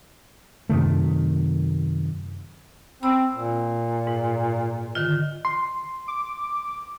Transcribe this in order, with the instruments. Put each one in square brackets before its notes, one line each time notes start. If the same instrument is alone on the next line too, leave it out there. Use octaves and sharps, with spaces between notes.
[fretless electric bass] F#2 C3 D#3 A3
[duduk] C4 [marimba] B5 E6
[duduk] A#2
[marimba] G#2
D3 D#3 F4
[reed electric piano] C6
[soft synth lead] D6